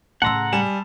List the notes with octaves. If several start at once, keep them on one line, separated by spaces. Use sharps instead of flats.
A2 C#3 F#5 A5 A#5 C6 E6
G3 G#5 E7